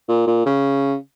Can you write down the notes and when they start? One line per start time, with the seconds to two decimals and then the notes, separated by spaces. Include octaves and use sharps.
0.08 A#2
0.27 A#2
0.46 C#3